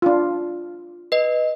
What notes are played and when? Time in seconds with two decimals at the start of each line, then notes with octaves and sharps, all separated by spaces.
0.02 D4 F4
1.12 B4 D#5